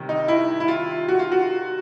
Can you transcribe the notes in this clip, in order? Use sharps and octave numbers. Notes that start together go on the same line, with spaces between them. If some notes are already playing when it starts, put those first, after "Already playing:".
Already playing: C3 D#3 G3
D#4
E4
E4
F4
F#4
F4
F#4